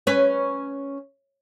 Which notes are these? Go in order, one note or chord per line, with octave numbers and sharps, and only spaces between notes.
C#4 B4